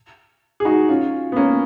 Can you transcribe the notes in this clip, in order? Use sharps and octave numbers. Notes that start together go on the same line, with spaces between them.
G#4
D#4 F#4
C#4 F4
B3
A#3 C#4